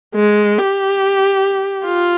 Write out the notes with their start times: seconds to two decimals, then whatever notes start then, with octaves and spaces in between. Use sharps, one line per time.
0.15 G#3
0.58 G4
1.85 F4